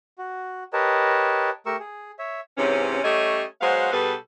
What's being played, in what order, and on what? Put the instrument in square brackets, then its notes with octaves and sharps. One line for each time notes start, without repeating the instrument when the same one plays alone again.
[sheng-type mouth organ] F#4
G4 A#4 B4 C#5 D#5 A5
A3 G4 A#4 C#6 E6
G#4
C#5 E5
[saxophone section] G#2 C3 E3 B3 C#4
G3 A3 C#4 C#5 D#5
F#3 G#3 B3 F#4 C5 F5
B2 G3 G#4 A4 B4